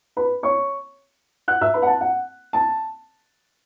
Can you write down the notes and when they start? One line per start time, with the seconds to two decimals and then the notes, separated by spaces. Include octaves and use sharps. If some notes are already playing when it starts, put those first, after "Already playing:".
0.17 B4 B5
0.43 C#5 C#6
1.48 F#5 F#6
1.61 E5 E6
1.74 B4 B5
1.82 F#5
1.87 A5
2.01 F#5
2.53 A5